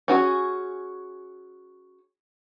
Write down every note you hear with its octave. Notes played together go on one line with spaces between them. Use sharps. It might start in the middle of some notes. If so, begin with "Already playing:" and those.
C#4 F#4 G#4